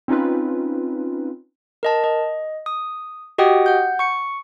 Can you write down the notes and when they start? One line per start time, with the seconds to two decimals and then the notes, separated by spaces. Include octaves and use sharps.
0.08 C4 C#4 D#4 F4 B4
1.83 A#4 D#5 A5
2.04 D#5
2.66 D#6
3.38 F#4 G4 D#5 F#5 G5 D#6
3.66 F#5 G6
3.99 C#6 C#7